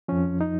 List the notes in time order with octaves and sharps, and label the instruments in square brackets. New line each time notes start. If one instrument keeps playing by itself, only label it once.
[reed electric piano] F2 F3 C#4
D#4